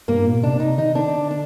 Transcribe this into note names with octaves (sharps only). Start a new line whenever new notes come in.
G2 A#3
A#2
C3 D4
C3 D#4
D#3 D#4
D3 D4
D4